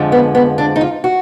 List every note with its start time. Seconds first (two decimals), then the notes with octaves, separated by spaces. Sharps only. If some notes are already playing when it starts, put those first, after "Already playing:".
Already playing: F2 D3 F3 G#3
0.12 B3
0.35 B3
0.58 D4
0.76 D#4
0.81 F4
1.04 F#4